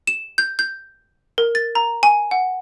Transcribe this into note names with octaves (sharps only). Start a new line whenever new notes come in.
E7
G6
G6
A#4
A6
A#5
G#5
F#5